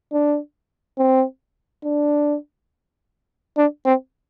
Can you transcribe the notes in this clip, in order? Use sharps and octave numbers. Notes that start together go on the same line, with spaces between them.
D4
C4
D4
D4
C4